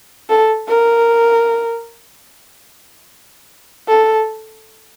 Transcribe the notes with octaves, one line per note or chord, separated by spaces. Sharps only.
A4
A#4
A4